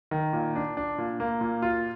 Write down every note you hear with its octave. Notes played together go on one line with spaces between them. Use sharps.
D#3
A#2
D4
D4
A#2
A#3
A#2
F4